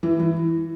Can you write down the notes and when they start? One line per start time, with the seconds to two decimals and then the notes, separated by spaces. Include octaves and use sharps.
0.03 E3
0.19 E3